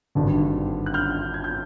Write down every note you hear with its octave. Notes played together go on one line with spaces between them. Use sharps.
G#1 G2 D3
F#6
F6 G6
G#6
G6